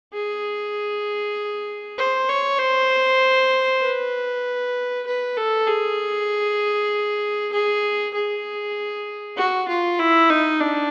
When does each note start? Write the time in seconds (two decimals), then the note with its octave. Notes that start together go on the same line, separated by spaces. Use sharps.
0.13 G#4
1.98 C5
2.29 C#5
2.59 C5
3.82 B4
5.06 B4
5.36 A4
5.67 G#4
7.52 G#4
8.14 G#4
9.37 F#4
9.68 F4
9.99 E4
10.30 D#4
10.60 D4